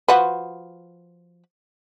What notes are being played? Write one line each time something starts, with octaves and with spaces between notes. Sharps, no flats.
F3 F#4 B4